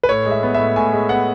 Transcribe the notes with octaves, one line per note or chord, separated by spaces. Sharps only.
B4
A2 C#5
G#3
E5
B3
A2 E5
A2 G#5
G#3
B3 F#5